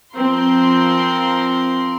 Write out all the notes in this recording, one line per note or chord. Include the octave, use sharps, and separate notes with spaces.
F3 C4 A#4 C6